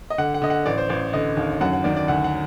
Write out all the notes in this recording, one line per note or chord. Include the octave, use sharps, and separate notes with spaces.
D#5
D3 F#5
F#5
D3 D#5
F#5
A1 D5
C5
A1 D5
D3 D#5
D#2
F#2 F#5
F#5
D#3 D5
D5
D2 F#5
F#5